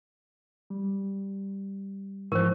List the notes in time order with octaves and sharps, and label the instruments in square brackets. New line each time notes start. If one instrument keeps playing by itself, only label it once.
[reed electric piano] G3
[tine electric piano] G#2 E3 F3 [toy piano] A#4 C5 [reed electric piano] C#6